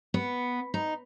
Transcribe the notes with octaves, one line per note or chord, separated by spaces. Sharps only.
B3
D#4